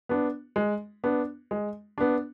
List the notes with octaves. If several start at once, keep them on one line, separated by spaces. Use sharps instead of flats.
B3 D4
G#3
B3 D4
G#3
B3 D4